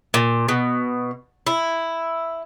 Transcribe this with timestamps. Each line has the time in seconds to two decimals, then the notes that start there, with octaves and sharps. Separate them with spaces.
0.14 A#2
0.49 B2
1.47 E4